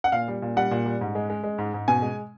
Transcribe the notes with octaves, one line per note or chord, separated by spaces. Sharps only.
F#5
A#2 F5
G3
A#2
G3 F#5
A#2
G3
G#2
G#3
G#3
G#3
G#2
G#2
B2 G#5
G#3